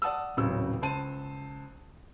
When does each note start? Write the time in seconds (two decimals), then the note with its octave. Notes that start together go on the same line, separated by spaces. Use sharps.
0.02 D5 F#5 A5 D#6 E6
0.37 D#1 A1 C#3 F#3 C4 E6
0.82 C#2 C5 A5 D#7